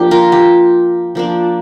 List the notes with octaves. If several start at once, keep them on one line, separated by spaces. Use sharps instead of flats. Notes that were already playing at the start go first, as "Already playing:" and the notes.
Already playing: F3 A#3 D4 G4
F4 A#4
G4
F3 A#3 D4